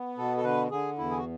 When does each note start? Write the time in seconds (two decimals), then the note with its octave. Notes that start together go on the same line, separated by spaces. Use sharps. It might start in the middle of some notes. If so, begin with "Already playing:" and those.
Already playing: B3
0.18 B2 A4
0.37 A4
0.44 D3 B4
0.71 D3 G#4
0.98 E2 E4
1.11 G#4
1.17 F#4